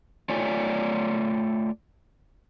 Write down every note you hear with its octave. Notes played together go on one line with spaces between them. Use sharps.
A3 F4 C#5 D5 G#5